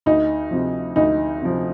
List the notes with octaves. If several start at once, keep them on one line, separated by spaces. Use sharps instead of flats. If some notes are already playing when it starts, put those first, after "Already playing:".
D2 D#4
C3 F3
D2 D#4
C3 F3